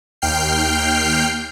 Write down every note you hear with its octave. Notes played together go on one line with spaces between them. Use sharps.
D#2 G5 F6 G6 C7